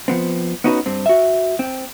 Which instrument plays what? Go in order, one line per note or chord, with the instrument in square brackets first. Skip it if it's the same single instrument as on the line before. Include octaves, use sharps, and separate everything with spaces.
[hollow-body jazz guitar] F3 B3 C4
B3 C#4 D#4 F#4 A4 B4
G2 C4
F#4 E5
C4